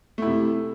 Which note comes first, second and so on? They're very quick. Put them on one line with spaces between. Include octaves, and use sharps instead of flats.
A3 E4 C3